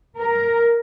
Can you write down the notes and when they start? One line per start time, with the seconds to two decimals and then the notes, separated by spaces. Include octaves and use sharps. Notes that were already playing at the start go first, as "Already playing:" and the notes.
0.18 A#4